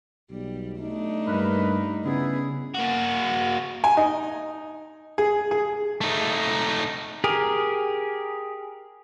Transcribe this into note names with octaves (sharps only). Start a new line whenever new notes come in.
B1 G3
A3 D4 D#4
G2 A#3 A#4 B4
C#3 B3 E4 G#4
A#3 F#4
G#5
D#4
G#4
G#4
A3 D#4
G4 G#4 A#4